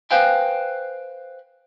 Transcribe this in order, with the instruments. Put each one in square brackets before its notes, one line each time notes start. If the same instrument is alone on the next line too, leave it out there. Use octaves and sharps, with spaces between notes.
[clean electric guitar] B4 C5 F5 G5 G#5